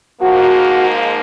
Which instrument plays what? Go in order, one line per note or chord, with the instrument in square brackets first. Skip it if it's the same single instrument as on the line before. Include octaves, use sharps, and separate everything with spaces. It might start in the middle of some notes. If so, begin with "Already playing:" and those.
[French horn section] G#2 F3 A#3 [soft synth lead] F#4